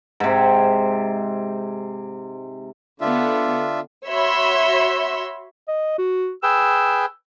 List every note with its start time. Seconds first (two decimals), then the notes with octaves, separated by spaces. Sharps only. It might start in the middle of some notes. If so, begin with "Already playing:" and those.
0.20 G#2 C3
3.01 D3 B3 D4 F4 E5
4.08 F#4 C#5 E5 B5 C6 E6
5.68 D#5
5.98 F#4
6.43 G#4 B4 G5 E6